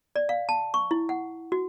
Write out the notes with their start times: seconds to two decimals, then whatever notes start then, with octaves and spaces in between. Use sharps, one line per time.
0.16 D5
0.29 F5
0.49 A5
0.74 C#6
0.91 E4
1.09 F#5
1.52 F#4